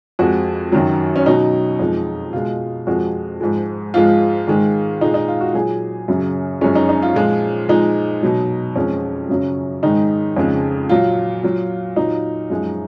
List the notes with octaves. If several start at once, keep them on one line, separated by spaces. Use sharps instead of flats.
F2 F3 G#3 F#4
F#2 D#3 F#3
C#4
B2 F#3 D#4
F2 F3 G#3
B2 G#3 F4
F2 F3 G#3 F#4
G#2 F3 G#3
G#2 F3 G#3 F4
G#2 D#3 G#3
A#2 G#3 D#4
D#4
F4
F#4
A#2 F#3 G#4
F#2 C#3 F#3
F#2 F3 G#3 C#4
D#4
D#4
F4
A#2 F3 G#3
A#2 F3 G#3 D#4
B2 F#3
F2 F3 G#3 C#4
F#2 C#3 F#3
G#2 D#3 G#3 D#4
F2 C#3 G#3
A#2 F#3 F4
A#2 F#3
A#2 F#3 D#4
F#2 F3 G#3